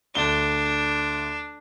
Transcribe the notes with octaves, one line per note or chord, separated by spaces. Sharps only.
D2 D4 G7